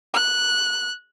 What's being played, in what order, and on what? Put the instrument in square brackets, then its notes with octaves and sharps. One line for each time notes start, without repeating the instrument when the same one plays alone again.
[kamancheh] F#6